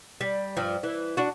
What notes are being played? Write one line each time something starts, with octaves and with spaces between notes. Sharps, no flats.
G3
G2 F3
E3
D4 F#4